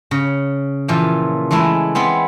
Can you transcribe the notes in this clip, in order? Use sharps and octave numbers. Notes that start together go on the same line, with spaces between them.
C#3
A#2 E3 F3
E3 G#3 A3 E4
G#3 B3 C4 B5